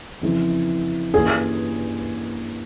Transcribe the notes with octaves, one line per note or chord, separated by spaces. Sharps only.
F2 C#3 E3 G#3 E4
G2 E3 A#3 C#4 F4 G#4